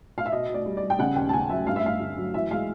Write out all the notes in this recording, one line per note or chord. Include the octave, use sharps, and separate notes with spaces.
F5
E5
B2 D#5
B2
D5
G3
D5
G3
G5
C#3 F#5
D#2 G5
A5
C#3 G#5
F#3 E5
G2 F5
E5
G2 F5
D3
F#3
E3 E5
G#3 F5